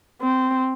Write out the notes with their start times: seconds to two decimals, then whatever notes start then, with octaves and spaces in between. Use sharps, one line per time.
0.22 C4